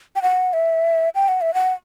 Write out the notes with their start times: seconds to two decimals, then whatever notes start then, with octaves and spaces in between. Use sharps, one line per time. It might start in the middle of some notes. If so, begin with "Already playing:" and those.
0.16 G5
0.22 F#5
0.53 E5
1.15 G5
1.28 F#5
1.41 E5
1.54 F#5